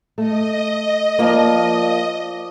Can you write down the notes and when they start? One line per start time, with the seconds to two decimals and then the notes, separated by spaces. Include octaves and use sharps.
0.18 A3 D#5
1.19 F3 A#3 F4 D5